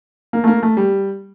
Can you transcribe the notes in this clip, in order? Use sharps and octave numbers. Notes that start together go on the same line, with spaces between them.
A#3
A3
A#3
A3
G3